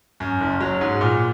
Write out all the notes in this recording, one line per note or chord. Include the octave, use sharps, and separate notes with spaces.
F#2
F#1
F#3
G#2
A#2